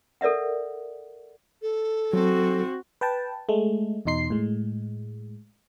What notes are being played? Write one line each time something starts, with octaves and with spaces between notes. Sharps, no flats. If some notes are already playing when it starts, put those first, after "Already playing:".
A4 A#4 D5 E5 F#5
A4
F#3 C4 F#4
B4 G5 A5
G#3 A3
E2 B2 D#4 C6 C7
A2 G#3